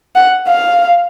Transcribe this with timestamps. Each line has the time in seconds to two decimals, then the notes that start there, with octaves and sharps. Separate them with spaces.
0.15 F#5
0.48 F5